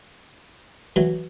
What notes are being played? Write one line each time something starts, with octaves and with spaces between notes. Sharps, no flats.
E3 F#3